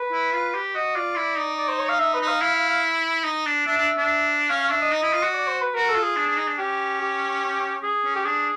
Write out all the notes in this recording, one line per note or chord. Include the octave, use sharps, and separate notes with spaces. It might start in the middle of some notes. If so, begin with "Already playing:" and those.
Already playing: B4
E4
F4
G4
F#4 D#5
F4 D5
E4
D#4
D5
C5
C#5
F5
D#4 E5
B4
D#4
F5
E4 F5
F5
F5
D#4
D4
D4 E5
D4
D4
C#4 F5
F5
D4 E5
D#5
D#4
E4
F4
F#4
D5
C5
B4
F#4 A#4
A4
F4
G#4
D4
D4
D#4
D4
C#4 G4
G4
G#4
C#4
G4
D4 G#4